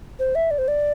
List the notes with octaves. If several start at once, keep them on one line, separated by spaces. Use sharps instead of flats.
C5
E5
D5
C5
D5